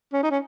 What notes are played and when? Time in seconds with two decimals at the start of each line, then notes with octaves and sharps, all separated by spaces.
0.13 C#4
0.23 D#4
0.31 C#4